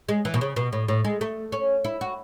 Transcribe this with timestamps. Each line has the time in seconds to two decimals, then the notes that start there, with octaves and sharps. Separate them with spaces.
0.09 G#3
0.25 E3
0.34 B2
0.41 C#3
0.56 B2
0.73 A2
0.88 A2
1.04 G#3
1.21 A3
1.52 C#4
1.84 E4
2.01 F#4